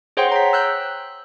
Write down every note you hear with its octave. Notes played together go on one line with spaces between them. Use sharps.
G#4 C5 C#5 F#5 G5 C6
A#5 B6
E6 F#6 G6